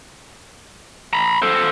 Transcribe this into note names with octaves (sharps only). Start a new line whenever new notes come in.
A#5 B5
A4 C5